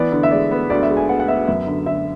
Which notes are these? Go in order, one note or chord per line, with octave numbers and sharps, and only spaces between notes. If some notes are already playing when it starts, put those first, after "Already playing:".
Already playing: E3 B3 D5
D3
E5
G#3 D5
B3
D2 D5
E5
G#3
G#5
B3 F#5
F#5
B3 E5
F#2 E5
D3
D3 E5